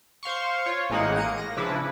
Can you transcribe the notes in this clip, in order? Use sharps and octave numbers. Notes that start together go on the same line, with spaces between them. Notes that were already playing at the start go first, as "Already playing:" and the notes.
C5 F5 C6 C#6
F4 C#5
A1 A2 G#3 A#3 D#4 F#5
A#3 C#7 D#7
A#6
C#3 F3 D4 E4 B4